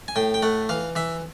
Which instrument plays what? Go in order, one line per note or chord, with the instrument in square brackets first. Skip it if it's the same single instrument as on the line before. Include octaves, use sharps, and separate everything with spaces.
[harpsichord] G#5
A2 G5
G5
A3 F#5
E3 F5
E3 E5